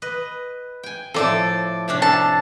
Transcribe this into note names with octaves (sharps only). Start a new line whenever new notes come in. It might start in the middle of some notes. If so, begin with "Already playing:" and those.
B4 D#5
G5 G#5
A2 F3 A4 D5
C3 C#4 D4
A4 F5 A5